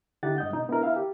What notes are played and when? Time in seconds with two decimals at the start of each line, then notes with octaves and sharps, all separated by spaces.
0.23 D3 D#4 E4 G4 F#5 A6
0.38 G2 D#5 G6
0.53 B2 D#4
0.69 B3 D4 E4 A#4
0.83 E4 E5 F5
0.96 G4